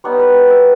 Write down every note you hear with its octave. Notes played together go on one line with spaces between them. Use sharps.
G3 B3 D#4 C#5
B4
G5
E5